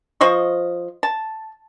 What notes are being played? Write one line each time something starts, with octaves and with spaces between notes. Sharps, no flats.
F3 C5 D#5 C#6
A5